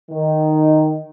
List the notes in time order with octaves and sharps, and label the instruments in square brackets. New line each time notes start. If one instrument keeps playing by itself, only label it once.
[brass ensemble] D#3